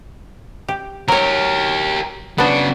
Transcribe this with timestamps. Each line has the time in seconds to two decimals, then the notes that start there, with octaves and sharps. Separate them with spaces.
0.68 G4
1.08 F#3 G4 A#4 C#5
2.38 C#3 B3 D4 F#4